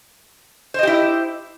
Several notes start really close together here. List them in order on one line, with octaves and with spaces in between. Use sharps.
C5 D#5 G4 E4